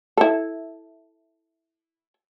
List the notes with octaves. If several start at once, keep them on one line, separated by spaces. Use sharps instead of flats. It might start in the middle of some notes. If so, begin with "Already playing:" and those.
E4 A4